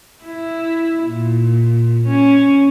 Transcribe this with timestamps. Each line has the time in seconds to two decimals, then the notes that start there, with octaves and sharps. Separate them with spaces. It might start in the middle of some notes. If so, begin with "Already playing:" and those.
0.25 E4
1.06 A#2
2.08 C#4